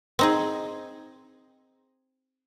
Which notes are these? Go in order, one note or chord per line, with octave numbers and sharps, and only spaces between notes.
C4 D#4 G#4